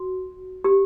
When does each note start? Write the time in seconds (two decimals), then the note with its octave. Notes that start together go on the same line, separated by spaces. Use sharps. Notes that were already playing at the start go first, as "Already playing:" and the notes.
Already playing: F#4
0.64 G4